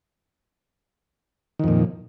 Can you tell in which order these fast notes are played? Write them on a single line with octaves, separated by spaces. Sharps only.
D#3 F2 A#2